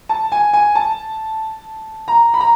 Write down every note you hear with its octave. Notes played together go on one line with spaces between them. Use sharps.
A5
G#5
G#5
A5
A#5
B5
A#5